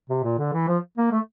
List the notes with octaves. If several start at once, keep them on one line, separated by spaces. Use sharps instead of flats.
C3
A#2
D3
E3
F3
A#3
A3